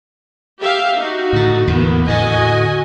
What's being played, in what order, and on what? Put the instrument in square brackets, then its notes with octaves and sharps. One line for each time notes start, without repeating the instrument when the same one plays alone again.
[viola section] G4 E5 F5
D#4 F#4
[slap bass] A2 D3
[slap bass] E2 A2 [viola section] A#3 B3
[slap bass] A2 D3 [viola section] F#4 D#5 G#5